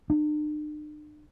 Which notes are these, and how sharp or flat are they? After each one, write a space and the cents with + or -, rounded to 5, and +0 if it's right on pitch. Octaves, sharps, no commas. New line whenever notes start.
D4 +45